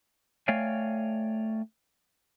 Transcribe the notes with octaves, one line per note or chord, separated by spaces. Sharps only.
A3 C#5 D5 F5 G5 G#5